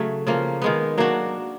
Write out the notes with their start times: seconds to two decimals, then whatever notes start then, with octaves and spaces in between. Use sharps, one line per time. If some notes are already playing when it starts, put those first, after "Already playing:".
Already playing: C#3 F#3 A3
0.27 C#3 F3 A#3
0.62 D#3 G#3 B3
0.98 F#3 A#3 D4 F#4